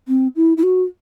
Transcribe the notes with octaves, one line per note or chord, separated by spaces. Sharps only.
C4
E4
E4
F#4